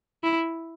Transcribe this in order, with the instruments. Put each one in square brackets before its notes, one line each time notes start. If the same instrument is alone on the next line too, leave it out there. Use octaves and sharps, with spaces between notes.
[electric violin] E4